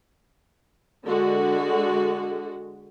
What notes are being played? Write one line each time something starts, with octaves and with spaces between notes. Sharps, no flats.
D3 G#3 F#4